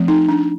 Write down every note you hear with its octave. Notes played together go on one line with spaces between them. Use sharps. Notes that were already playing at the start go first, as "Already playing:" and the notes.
Already playing: F3 A3 C4
D#4
D4